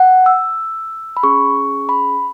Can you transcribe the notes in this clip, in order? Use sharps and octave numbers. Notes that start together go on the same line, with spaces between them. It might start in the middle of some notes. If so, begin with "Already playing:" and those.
Already playing: F#5
E6
B5
C#4 G#4 C#6
B5